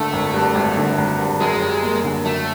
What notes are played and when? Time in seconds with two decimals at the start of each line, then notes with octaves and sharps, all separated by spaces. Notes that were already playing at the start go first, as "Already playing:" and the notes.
Already playing: G#1 D3 A3
0.13 G#1
0.34 G2
0.55 G#1
0.77 D3
0.98 G#1
1.20 G2
1.40 F#2 G#3
1.62 G3
1.83 A#3
2.04 D3
2.25 F#2 A3